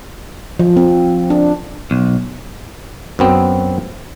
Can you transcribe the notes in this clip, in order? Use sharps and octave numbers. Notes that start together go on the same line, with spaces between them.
F3
C4
D4
B1
F#2 B3 C4